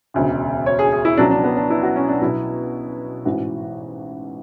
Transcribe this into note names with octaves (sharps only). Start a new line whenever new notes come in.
E1 D2 C#3
C#5
G#4
G#4
E4
C#2 B2 F#3 D4
D4
B3
D4
E4
F#4
C#4
D4
B1 B2 F#3 E4
A1 G#2 E3 F#4